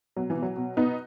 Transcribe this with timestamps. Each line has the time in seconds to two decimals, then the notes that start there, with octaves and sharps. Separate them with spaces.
0.16 B2 F#3
0.30 E3
0.36 B2
0.42 F#3
0.56 B2
0.77 B2 B3 D#4